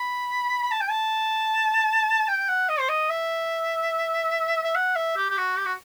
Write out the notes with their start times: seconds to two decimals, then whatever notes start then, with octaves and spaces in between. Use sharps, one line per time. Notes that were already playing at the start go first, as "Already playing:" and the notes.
Already playing: B5
0.63 B5
0.72 A5
0.81 G5
0.90 A5
2.28 G5
2.49 F#5
2.69 D#5
2.80 C5
2.89 D#5
3.10 E5
4.63 E5
4.76 F#5
4.96 E5
5.17 G4
5.30 G4
5.38 F#4
5.58 G4
5.66 F#4